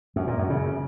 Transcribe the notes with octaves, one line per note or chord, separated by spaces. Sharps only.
F#2
A#2
F#2
C#3